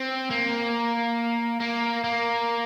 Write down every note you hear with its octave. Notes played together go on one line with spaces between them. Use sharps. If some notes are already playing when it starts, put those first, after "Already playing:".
Already playing: C4
A#3
A#3
A#3